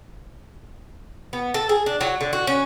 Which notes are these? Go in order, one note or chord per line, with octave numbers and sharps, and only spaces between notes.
B3
A4
G#4
D4
F#3
D3
F#4
C#4